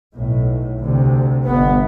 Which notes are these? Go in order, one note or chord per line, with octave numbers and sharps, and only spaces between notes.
B1 A2
D2 C3
G1 G2 B3